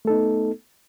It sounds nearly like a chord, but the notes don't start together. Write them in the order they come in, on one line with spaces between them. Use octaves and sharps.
A3 A4 D#4 B3